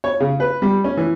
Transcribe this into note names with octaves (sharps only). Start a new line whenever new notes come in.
C#5
C#3
B4
G3
C#4
E3